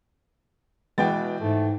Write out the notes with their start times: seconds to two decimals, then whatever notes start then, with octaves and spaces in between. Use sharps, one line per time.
0.98 B2 E3 G#3 B3 G5 A6
1.41 G#2 A3